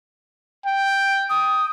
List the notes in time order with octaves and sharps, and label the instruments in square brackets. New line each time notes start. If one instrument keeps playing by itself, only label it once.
[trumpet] G5
[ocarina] D#6